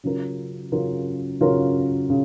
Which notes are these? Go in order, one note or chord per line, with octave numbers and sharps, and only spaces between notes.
C#3 F#3 C#4 F4 A#4
C#3 F#3 C#4 F4 A#4
C#3 F#3 C#4 F4 A#4
C#3